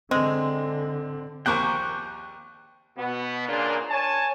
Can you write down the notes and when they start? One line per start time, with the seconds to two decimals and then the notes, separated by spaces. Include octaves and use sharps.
0.11 D3 G#3 C4
1.46 A#1 D#2 A#4 C5 G5 C#6 D6 F#6
2.98 B2 B3
3.48 A#2 C#3 A#3 D4 F4
3.90 C#5 G#5 A5